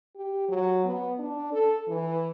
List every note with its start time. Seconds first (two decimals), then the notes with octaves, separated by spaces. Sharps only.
0.16 G4
0.49 F#3
0.85 B3
1.19 D4
1.53 A4
1.88 E3